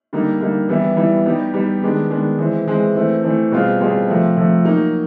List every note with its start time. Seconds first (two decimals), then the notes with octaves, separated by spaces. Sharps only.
0.13 D3 G3 A#3 D#4
0.40 D3 G3 A#3 D#4
0.69 E3 G3 B3 E4
0.97 E3 G3 B3 E4
1.26 G3 B3 D#4 G4
1.54 G3 B3 D#4 G4
1.82 D#3 G#3 B3 D4
2.10 D#3 G#3 B3 D4
2.38 E3 G#3 C4
2.67 E3 G#3 C4
2.95 E3 A3 C4
3.23 E3 A3 C4
3.52 B2 G3 C4 F4 G#4
3.80 B2 G3 C4 F4 G#4
4.08 C3 F3 A3
4.37 C3 F3 A3
4.65 F#3 A#3 D#4